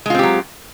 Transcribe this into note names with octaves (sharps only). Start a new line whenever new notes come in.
F#3 G#3 C4 F4 G4